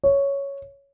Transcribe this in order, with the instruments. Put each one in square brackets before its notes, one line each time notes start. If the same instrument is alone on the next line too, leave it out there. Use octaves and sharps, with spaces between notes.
[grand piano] C#5